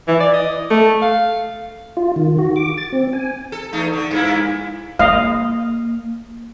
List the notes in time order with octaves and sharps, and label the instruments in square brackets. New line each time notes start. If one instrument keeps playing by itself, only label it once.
[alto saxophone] E3
D5
D#5
A3
F5
[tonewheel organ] F4
D#3
F#4
D6
A6
C4
G#5
[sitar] A4
E2 A3 D#4
D3
G2 A#3 E4
[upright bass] A#3 [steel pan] D#5 F5